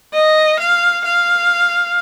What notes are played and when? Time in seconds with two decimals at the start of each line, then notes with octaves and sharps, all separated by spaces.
0.13 D#5
0.59 F5
1.04 F5